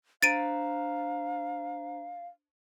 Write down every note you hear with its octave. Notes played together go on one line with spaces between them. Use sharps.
D4 C5 F5 A#5 A6 D7 D#7